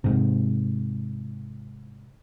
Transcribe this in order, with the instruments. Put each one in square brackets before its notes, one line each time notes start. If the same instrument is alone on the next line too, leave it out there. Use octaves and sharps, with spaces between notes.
[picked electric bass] G#2 C3